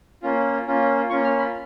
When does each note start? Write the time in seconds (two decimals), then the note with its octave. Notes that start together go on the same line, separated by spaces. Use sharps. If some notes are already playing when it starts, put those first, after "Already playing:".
0.23 A#3 C#4 F4
0.66 A#3 C#4 F4
1.10 A#3 C#4 F4 C#6
1.24 F6
1.39 B5